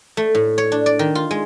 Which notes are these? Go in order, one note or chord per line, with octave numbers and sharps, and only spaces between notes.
A3
A2
C#5
D4
D5
D#3
F4
G#3